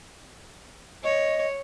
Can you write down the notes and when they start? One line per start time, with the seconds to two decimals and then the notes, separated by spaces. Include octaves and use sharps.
1.04 C#5 D#5